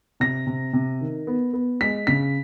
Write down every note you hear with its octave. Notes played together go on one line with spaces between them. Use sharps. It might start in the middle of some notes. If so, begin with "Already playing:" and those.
C3 A#6
C3
C3
D#3
B3
B3
G#3 B6
C#3 B6